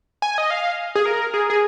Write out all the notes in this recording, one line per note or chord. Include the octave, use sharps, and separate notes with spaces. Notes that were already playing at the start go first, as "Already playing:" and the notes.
G#5
D#5
F5
G#4
A#4
G#4
G#4